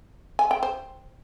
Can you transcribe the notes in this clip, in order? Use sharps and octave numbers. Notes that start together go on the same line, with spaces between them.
G#5
G5
C5